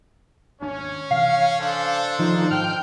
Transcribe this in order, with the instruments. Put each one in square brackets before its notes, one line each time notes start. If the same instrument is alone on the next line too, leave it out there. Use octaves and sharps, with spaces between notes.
[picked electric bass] G#1 D#2 D4 [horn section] C#4 C#5
[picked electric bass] C3 E3 [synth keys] F5
[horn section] D4 A4 C5
[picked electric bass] D#3 C#4 [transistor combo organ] F3 D#4
[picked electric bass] G#2 [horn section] G5 [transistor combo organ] F6